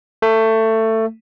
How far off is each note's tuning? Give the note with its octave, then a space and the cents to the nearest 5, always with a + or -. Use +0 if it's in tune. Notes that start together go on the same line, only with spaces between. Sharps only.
A3 +20